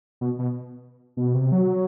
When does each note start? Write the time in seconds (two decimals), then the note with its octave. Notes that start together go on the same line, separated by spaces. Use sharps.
0.21 B2
0.39 B2
1.17 B2
1.34 C3
1.52 F#3